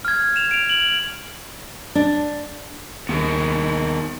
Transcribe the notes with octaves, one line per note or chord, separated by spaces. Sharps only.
F6 G#6
E7 F7
D7 F7
F#7
D4
D#2 B3 G#4 A#4